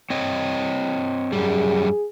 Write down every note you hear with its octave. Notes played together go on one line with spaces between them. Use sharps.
C4 C#5 D#5
F#2 G3 G#4